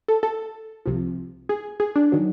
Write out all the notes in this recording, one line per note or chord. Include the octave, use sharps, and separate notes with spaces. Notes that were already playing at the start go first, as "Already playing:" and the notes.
A4
A4
C2 C3 F3
G#4
G#4
D4
D#3 F#3